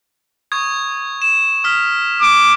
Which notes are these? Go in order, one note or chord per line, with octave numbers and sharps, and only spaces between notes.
C#6 D#6 G#6
E7
D#6 F6 B6
D6